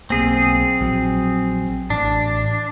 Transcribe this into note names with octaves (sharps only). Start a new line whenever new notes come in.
B1 A#3 C4 G#4
A#1 F#3
A1 D4